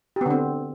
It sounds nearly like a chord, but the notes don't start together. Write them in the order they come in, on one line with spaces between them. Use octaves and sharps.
G4 B3 D3 C4